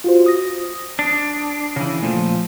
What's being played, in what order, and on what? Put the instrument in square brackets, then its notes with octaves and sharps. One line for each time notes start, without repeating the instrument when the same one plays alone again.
[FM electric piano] F4 F#4 C5
D#6 A#6
[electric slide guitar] D4
C#3 E3
[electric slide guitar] A#2 F3 [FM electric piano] A3